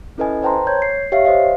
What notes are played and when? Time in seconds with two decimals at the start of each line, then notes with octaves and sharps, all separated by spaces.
0.18 C#4 E4 A4 B4 D#5 G#5
0.43 B4 C5 G5 A5 A#5 C6
0.67 C#5 G6 G#6
0.82 C7
1.12 G4 C#5 E5 F5 C7
1.25 C5 D#5 F5